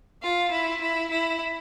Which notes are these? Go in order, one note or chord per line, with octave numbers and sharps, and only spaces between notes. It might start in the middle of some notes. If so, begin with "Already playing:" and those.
F4
E4
E4
E4